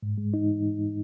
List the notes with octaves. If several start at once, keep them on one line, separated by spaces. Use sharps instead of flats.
G#2
G#3
D#4